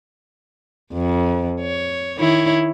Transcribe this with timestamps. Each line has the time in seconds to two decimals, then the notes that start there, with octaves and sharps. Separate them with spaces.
0.93 F2
1.61 C#5
2.18 D#3 E4 C#5